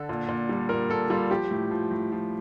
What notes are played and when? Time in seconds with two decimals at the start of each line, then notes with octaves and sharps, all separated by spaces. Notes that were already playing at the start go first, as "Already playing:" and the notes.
Already playing: D3 A4
0.09 A#2
0.29 A#2
0.49 G3
0.69 A#2 A#4
0.90 A#2 A4
1.10 G3 F4
1.31 F3 G4
1.51 A2
1.71 F3
1.91 A2
2.12 F3